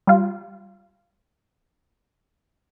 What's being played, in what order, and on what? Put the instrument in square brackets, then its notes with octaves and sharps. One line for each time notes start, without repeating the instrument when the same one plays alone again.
[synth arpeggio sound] G3 F4